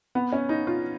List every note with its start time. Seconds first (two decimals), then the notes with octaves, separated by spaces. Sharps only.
0.15 B3
0.33 C#4
0.49 D#4
0.67 F4